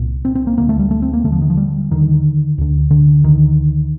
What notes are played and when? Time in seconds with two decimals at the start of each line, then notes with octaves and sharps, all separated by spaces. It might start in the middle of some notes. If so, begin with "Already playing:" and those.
Already playing: C2 A#2
0.25 C4
0.35 C4
0.47 A#3
0.57 D2 D3 A#3
0.69 A3
0.79 G3
0.91 A3
1.02 C4
1.13 A#3
1.24 D#2 D3 A3
1.32 F3
1.42 D#3
1.50 F3
1.57 G3
1.91 D#2 D3 D#3
2.58 D2 D3
2.91 D3
3.24 D2 D3 D#3